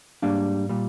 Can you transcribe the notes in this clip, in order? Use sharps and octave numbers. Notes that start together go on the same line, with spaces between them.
G#2 G3 A#3 D4 F5
A#2 G3